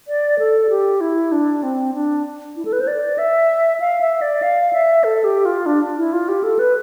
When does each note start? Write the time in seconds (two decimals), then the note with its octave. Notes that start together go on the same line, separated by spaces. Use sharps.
0.08 D5
0.39 A4
0.70 G4
1.01 E4
1.32 D4
1.63 C4
1.94 D4
2.56 E4
2.65 A4
2.73 B4
2.80 C5
2.87 D5
3.18 E5
3.80 F5
4.01 E5
4.22 D5
4.42 F5
4.73 E5
5.04 A4
5.24 G4
5.45 F4
5.66 D4
5.97 E4
6.13 F4
6.29 G4
6.43 A4
6.59 B4